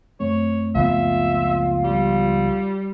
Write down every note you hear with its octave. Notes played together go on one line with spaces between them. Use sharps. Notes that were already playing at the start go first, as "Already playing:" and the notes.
F#2 A3 C4 C#5
C#2 F3 B3 F4 E5
G3